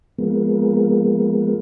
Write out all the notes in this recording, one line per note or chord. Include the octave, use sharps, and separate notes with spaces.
F3 G#3 A#3 B3